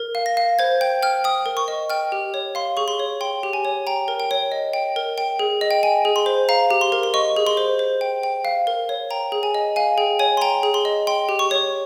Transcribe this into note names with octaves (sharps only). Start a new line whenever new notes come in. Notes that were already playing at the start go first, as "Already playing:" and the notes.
Already playing: A#4
F5
A#6
F5
C5 G#6
G5 G6
G5 F6
G5 D#6
A#4
C#6
D#5
G5 F6
G4
C#5
F5 C6
G#4 C#6
C6
C#5
G5 C6
G4
G#5
C#5
G5 A#5
A#4
G5
C#5
D#5
G5
A#4
G5
G#4
D#5
G5
G5 G#5
G#4
C6
C5
F5 A#5
G4
C6
A#4
C6
D#5 C#6
G#4
C6
C5
C5
G5
G5
F5
A#4
C#5
G5 A#5
G#4
G#5
D#5
F5 G#5
G#4 G5
C#5 G#5
C6
G5 A#5
G#4
C6
D#5
G5 C6
G4
C#6
C#5